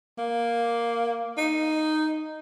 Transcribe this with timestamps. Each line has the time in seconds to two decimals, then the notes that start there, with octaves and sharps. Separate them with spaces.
0.18 A#3
1.37 D#4